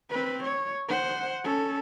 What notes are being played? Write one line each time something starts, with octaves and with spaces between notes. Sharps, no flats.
C4 B4
C#5
C5 F#5
C#4 A4